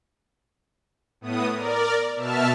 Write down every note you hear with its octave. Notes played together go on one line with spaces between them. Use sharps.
A2 B3 D#6
A#4 D5
B2 E5 A5 F6